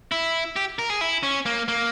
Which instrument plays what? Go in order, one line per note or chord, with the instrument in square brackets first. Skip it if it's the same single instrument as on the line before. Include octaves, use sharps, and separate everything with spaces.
[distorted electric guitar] E4
G4
A#4
G#4
E4
C#4
A#3
A#3